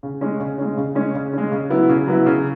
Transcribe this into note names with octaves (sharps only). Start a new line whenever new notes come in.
C#3
G#3 C#4
C#3
G#3 C#4
C#3
G#3 C#4
C#3
G#3 C#4
C#3
F#3 B3 E4
C#3
F#3 B3 E4
C#3